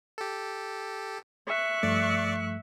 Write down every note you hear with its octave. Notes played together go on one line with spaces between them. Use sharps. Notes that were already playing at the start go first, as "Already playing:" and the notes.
G4 A4
E5 C#6 F#6
G2 F3 A3 D5